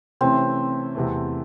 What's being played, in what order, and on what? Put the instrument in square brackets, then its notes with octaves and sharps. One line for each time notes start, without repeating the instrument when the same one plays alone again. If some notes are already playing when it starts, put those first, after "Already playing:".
[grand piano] C3 E3 A3 C#4 E4 [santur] C4
[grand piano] E2 C3 E3 A3